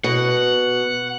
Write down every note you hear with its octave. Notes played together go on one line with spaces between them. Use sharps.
B2 F#5